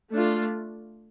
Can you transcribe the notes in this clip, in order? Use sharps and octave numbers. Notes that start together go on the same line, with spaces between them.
A3 D4 F4